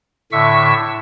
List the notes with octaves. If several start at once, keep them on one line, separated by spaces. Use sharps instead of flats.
A2 D3 E5 C#6 E6